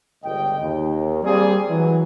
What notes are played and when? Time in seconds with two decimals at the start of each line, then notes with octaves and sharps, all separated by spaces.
0.24 G1 C#2 D#5 G5
0.60 D#2
1.23 G3 A#3 C4 G#4
1.69 E3 F#3